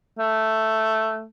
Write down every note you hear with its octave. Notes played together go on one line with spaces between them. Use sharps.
A3